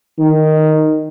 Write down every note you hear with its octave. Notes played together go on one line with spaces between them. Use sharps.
D#3